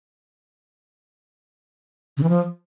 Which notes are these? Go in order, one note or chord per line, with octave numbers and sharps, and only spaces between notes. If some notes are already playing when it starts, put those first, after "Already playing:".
C#3
E3
F3